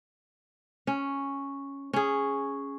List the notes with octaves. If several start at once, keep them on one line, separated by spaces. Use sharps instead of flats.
C#4
C#4 G#4